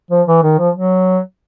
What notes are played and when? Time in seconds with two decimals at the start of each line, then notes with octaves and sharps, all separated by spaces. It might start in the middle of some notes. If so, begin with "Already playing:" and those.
0.11 F3
0.28 E3
0.43 D#3
0.59 F3
0.75 F#3